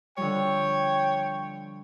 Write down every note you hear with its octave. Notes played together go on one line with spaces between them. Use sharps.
D3 F3 G3 C#5 G5